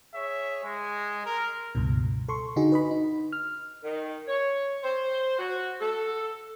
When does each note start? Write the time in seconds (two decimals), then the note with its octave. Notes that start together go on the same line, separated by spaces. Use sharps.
0.15 G#4 C#5 E5
0.64 G#3
1.26 A#4
1.75 C#2 G2 B2
2.28 A4 C6 C#6
2.56 D3 D#4 F#4 G#4
2.72 B4 D#5 B5
2.91 D#4
3.32 F6
3.83 D#3
4.28 C#5
4.83 C5
5.38 F#4
5.81 A4